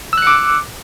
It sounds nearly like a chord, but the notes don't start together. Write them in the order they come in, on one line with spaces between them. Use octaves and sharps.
E6 F#6 C#7 D6